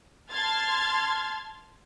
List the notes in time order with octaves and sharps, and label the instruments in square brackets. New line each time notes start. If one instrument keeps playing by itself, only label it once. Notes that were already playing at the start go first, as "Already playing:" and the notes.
[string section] A5 C6 F6 G#6 A6